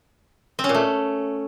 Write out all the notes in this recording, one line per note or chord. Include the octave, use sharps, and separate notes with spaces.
C4
C#4
A#2
A3